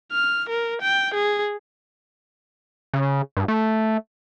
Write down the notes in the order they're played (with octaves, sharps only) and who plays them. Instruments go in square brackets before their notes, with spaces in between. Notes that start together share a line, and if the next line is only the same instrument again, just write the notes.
[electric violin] F6
A#4
G5
G#4
[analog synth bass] C#3
G2
A3